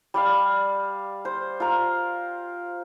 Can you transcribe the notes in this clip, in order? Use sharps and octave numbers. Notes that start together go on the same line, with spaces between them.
G3 D5 F5
C5
F4 A#4